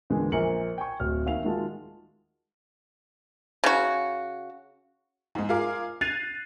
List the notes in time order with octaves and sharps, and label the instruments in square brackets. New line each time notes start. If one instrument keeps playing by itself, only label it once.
[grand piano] E2 A#2 D3 G#3
A#1 A#2 A#4 C#7 F#7
G5 G#5 C#6
D1 F6
D#2 E5 F5 F7
D#3 G#3 F4 F#4 A5
[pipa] C#3 F#4
[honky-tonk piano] G#2 G#3
F4 G#4 A#4 F5 D6
F#6 G#6 A6 C7 D#7 F7